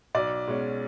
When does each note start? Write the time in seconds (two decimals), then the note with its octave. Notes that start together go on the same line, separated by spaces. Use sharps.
0.15 B1 D5
0.47 B2 G#3 C#4